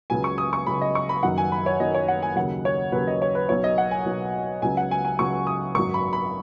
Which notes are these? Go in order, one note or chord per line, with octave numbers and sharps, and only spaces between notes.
C#2 C#3 F#3 G#5
C#6
D#6
C#6
C#2 C#3 F#3 B5
D#5
C#6
B5
F#1 F#2 D#3 F#3 F#5
G#5
B5
C#5
F#1 F#2 D#3 F#3 D#5
C#5
F#5
G#5
D#2 C#3 F#3 F#5
C#5
D#2 C#3 F#3 B4
D#5
C#5
B4
B1 B2 F#3 C#5
D#5
F#5
G#5
B1 B2 F#3
C#2 C#3 F#3 G#5
F#5
G#5
G#5
C#2 C#3 F#3 C#6
D#6
G#1 F#2 F#3 C#6
B5
B5